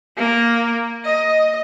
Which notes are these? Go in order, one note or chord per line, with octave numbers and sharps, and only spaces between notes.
A#3
D#5